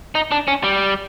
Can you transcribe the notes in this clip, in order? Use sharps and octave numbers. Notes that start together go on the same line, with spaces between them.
D#4
D4
C#4
G3